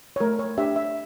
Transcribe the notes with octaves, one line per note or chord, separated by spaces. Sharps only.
C#5
A3 A#4
C#5
D4 G4 E5
E5